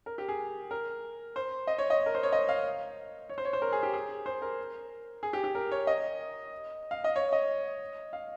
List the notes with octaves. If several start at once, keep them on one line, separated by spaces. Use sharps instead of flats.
A#4
G4
G#4
A#4
C5
D#5
C#5
D#5
A#4
C5
C#5
D#5
F5
C#5
C5
C#5
C5
A#4
G#4
G4
G#4
C5
A#4
G#4
G4
G4
A#4
C#5
D#5
F5
D#5
C#5
D#5
F5